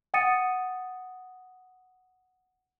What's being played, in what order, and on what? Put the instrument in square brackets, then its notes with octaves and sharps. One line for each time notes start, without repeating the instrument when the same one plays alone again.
[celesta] F#5 G5 D#6 A6 C#7 D#7